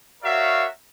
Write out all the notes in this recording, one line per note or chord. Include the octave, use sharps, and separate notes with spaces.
F#4 A#4 C#5 D5 E5 F5